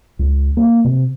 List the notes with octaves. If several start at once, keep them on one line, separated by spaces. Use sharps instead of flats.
C#2
A#3
C3